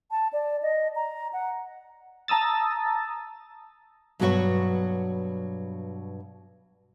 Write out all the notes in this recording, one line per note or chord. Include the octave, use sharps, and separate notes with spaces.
A5
D5
D#5
A#5
F#5
A5 A#5 D#6 E6 A6
G2 B2 F#3 B3 F#4 C#5